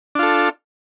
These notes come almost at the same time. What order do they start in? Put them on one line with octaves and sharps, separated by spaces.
D4 F4 A4